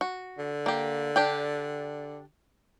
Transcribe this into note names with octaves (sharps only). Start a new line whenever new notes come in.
F#4
D3
A#3 G4
D4 G4 G5